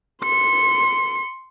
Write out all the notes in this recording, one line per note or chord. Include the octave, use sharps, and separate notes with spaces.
C6 C#7